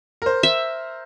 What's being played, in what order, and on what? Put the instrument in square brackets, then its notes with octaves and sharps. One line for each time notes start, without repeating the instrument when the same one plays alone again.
[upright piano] A#4 C5
[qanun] E5